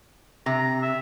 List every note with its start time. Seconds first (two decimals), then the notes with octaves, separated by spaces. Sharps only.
0.46 C3 A#5
0.82 E5